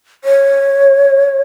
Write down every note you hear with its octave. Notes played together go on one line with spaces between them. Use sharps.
C#5